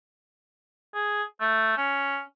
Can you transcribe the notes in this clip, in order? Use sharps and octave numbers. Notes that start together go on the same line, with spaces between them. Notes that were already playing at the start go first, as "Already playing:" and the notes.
G#4
A3
C#4